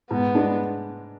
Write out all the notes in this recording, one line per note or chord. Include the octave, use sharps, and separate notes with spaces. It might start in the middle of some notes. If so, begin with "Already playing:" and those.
G#2 B3
G#3 D4